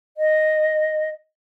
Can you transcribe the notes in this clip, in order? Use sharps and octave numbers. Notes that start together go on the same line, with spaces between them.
D#5